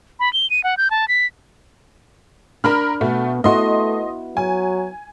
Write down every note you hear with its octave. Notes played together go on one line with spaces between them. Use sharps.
B5
G7
D#7
F#5
G6
A5
B6
D4 A#4 B5 F6
B2 A3 B3 F#4
A3 B3 E4 F#4 D#5 C6
F#3 G#5